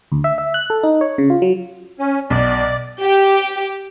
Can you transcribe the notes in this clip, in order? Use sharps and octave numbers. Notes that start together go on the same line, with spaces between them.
D2
E5
E5
F#6
A4
D#4
C#5
C#3
F4
F#3
C#4
B1 D5
G4